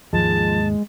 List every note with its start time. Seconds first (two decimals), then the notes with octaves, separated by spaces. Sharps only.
0.13 D#2 G#2 F3 G#3 A5